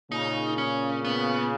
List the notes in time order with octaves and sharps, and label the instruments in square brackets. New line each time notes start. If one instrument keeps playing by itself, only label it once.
[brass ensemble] A#2 C#3 [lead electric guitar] D#4
[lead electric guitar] C#4
B3